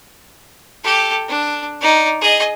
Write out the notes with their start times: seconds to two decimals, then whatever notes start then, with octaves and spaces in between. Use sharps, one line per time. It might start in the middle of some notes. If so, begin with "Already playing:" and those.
0.83 G4 A4
1.28 D4
1.80 D#4 D5
2.21 G#4 D#5